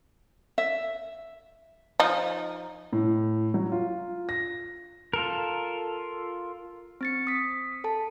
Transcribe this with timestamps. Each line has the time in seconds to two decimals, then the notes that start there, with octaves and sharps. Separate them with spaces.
0.58 E5
2.00 F3 D#4
2.93 A2
3.54 F#3
3.72 F4
4.29 A#6
5.13 F4 A4 A#4
7.01 C4 A6 C#7
7.27 D#6 B6
7.84 A4 A5